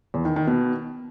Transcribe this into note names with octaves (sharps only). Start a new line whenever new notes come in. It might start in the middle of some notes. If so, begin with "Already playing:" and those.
E2
D#3
D#3
B2